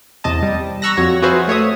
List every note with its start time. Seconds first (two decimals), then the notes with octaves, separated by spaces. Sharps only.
0.24 E2 C3 D#5 A5
0.42 G3
0.82 A#5 C#6 E6 F#6 A#6
0.97 F2 F#4 C#5
1.22 F4 F#4 G#4 B4 C5 E5
1.48 A3 C#5 E5 D#6